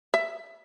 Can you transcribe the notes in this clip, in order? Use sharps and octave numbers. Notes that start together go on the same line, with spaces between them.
E5